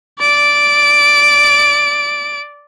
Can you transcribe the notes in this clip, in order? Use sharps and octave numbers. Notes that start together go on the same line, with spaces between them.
D5 D7